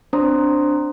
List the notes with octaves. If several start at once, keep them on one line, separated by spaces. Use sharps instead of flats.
C4 D4 C5 A#5 D#6